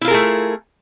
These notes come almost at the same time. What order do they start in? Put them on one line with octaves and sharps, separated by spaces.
E4 F4 A#4 G#4 A3